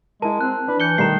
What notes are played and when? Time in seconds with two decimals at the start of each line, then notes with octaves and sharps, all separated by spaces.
0.22 G#3 E4 A#4 A5
0.41 C4 F#6
0.68 D4 B4
0.80 E3 G6 C#7 G7
0.98 B2 D#3 G3 A3 A#5 C7